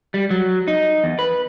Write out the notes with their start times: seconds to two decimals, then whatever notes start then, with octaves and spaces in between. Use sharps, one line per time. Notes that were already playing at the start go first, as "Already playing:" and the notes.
0.14 G3
0.30 F#3
0.68 D#4
1.04 E2
1.19 B4